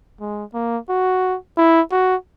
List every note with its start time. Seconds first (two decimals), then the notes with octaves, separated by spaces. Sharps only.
0.20 G#3
0.54 A#3
0.89 F#4
1.57 E4
1.91 F#4